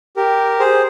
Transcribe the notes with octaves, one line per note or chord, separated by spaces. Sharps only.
G4 A#4
G#4 C5